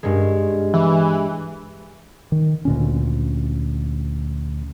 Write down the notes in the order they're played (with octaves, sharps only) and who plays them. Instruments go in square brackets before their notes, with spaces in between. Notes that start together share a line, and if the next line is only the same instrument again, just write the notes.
[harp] G2 G#3
[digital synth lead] E3
[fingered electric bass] D#3
D2 A#2 C#4